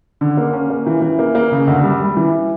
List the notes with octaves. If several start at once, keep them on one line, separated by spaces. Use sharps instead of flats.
D3
A#3
C#4
A#3
E3
E3
A#3
A#3
C#3
D2
G3
G3
E3